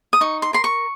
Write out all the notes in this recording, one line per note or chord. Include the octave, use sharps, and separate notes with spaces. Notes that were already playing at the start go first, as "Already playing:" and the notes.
D#6
D#4 C#6
C6
A#4 C6
C#6